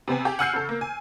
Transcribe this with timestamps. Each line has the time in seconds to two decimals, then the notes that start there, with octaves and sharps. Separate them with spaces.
0.08 C3 B3 C4 G#5
0.25 G4 G#4
0.39 F#5 G#5 E6 F6 G6 C7
0.53 C#3 A4
0.69 A#3
0.81 G#5